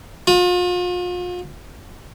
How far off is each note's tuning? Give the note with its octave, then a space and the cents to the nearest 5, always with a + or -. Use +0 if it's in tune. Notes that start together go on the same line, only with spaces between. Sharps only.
F4 +40